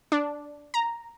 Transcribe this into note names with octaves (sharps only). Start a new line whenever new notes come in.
D4
A#5